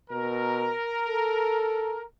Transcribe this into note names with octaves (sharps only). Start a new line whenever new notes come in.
B2 A#4
A4